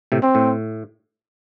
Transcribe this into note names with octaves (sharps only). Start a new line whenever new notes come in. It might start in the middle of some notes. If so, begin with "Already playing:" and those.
A2 C3
C4
A2